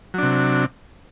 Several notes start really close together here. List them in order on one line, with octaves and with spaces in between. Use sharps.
F#3 D4 C3